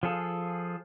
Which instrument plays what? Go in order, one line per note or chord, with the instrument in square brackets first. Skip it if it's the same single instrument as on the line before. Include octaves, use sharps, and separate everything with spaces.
[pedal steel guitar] F3 F4 G#4 A4